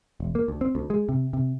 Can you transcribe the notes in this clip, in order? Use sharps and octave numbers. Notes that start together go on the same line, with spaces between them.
E1
A#3
D2
C4
D2
G#3
C3
C3